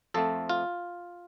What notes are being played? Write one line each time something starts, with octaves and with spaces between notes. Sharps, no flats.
F2 F3 A3 C4 A4
F4